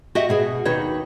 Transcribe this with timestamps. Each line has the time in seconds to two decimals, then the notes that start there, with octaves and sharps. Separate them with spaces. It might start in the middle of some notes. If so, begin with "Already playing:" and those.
0.15 F#4 G4 D#5 E5
0.29 B2 F#4 G#4
0.65 D#2 D#3 D#4 F#4 B4 C#5